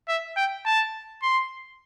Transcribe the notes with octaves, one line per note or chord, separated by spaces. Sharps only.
E5
G5
A5
C6